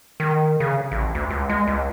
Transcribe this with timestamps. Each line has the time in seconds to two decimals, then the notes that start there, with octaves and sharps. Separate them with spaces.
0.20 D#3
0.60 C#3
0.92 A1
1.15 D2
1.30 C#2
1.50 G#3
1.68 C#2